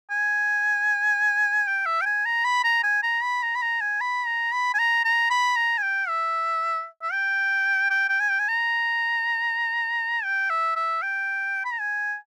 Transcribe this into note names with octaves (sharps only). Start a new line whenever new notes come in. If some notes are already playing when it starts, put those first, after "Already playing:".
G#5
G5
E5
G5
G#5
A#5
B5
A#5
G#5
A#5
B5
A#5
B5
A#5
G#5
B5
A#5
B5
G#5
A#5
A#5
B5
A#5
G#5
G5
E5
E5
G5
G5
G5
G#5
G5
G#5
A#5
G5
E5
E5
G5
B5
A#5
G#5